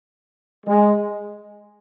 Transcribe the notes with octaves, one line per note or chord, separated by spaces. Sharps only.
G#3